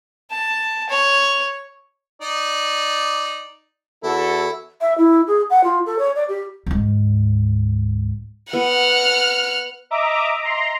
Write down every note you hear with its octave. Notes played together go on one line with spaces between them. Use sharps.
A5
C#5
D#4 D5
E2 E4 F#4 A4
E5
E4
G#4
F#5
F4
A4
C#5
D5
G4
D2 G#2
B3 F#5 F6
D#5 E5 A#5 D6
A#5 C6